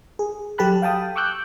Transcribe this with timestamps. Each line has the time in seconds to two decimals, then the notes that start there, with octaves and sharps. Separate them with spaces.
0.19 G#4
0.58 F#3 G4 A4 A5 B5 F#6
0.82 F5 G5 A5 D#6
1.16 C#6 D6 E6 F#6 G6